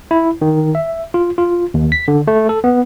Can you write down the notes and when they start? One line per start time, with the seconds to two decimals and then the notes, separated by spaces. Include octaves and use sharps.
0.11 E4
0.42 D#3
0.75 E5
1.14 F4
1.38 F4
1.74 D#2
1.92 B6
2.08 D3
2.27 A3
2.49 A4
2.64 B3